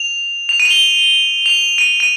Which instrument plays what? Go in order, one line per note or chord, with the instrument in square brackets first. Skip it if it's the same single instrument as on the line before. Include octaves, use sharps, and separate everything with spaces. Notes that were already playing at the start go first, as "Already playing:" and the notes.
Already playing: [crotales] F7
F7
D#7
F7
G7
F7
D#7
D#7